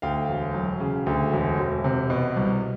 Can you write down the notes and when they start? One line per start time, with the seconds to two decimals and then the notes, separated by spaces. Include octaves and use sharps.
0.02 D2 F5 G5
0.29 E1
0.54 F#3
0.80 C#3
1.06 D2
1.33 E1
1.59 E1
1.84 C3
2.10 B2
2.36 C2